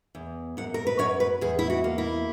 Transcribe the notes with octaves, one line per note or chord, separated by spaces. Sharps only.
E2
F#2 F#5
A#4
B4
F#2 C#5
B4
E2 G#4
E4
F#4
A#3
E4